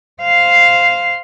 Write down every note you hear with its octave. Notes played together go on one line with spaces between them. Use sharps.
C5 F5